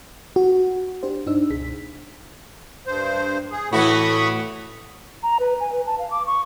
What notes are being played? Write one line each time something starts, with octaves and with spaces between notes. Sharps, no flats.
F#4
D4 G4 C5
G2 D4 D#4 C5 E6
C#2 B2 G#4 B6
G2 C5
G#4
A2 E3 E4 F#4 B5 C#6 D#6
A#5
B4
G#5
B4
A5
F5
D6
C#6